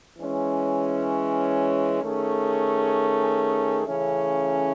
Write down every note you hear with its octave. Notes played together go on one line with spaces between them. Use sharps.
E3 G#3 C#4
D#3 A3 C#4 G#4
C#3 E3 A3 C#4